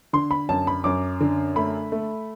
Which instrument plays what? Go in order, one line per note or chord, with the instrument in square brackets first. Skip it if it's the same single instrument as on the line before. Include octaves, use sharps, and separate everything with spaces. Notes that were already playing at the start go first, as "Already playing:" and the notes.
[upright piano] D3 C6
B5
F#2 A5
B5
F#2 D6
D3
A3 B5
A3